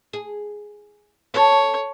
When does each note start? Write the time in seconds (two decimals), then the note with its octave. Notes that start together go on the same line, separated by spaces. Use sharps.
0.13 G#4
1.34 A4 C#5